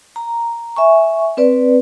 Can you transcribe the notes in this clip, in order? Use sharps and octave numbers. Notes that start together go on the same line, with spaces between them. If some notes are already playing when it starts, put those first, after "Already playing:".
A#5
E5 G#5 C#6
C4 B4 D5